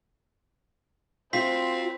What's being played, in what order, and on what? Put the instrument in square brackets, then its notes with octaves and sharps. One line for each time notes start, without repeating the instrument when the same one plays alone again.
[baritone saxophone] C4 [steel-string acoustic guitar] F4 F#4 [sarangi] C5 [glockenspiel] B6